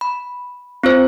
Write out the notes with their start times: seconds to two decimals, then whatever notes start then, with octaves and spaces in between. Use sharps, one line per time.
0.01 B5
0.83 C4 F4 C5